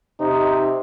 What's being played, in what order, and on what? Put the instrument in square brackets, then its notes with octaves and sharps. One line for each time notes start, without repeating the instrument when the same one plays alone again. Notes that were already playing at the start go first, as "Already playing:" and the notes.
[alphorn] C3 [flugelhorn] D#4